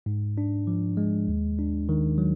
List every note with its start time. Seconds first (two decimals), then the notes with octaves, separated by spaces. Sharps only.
0.06 G#2
0.38 D4
0.67 F3
0.97 G#3
1.28 D#2
1.59 D4
1.89 D#3
2.18 F#3